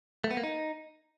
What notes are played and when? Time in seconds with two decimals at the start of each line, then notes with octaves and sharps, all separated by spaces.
0.24 A3
0.31 B3
0.37 A#3
0.44 D#4